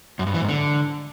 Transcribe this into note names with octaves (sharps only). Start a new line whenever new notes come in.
F#2
G2
E3
G#2
D3